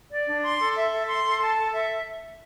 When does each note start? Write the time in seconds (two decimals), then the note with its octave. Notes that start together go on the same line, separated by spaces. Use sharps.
0.10 D5
0.26 D4
0.42 C6
0.59 A4
0.75 E5
0.92 A4
1.08 C6
1.24 A4
1.41 A5
1.58 A4
1.74 E5